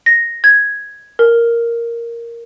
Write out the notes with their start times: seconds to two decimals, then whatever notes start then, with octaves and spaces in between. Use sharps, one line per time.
0.06 A#6
0.44 G#6
1.19 A#4